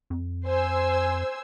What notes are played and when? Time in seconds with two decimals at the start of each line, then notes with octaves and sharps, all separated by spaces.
0.10 F2
0.46 C5 G#5 E6